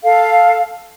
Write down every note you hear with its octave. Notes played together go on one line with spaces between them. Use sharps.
A4 F5